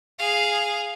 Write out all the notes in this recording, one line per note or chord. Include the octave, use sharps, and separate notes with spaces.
G#4 F5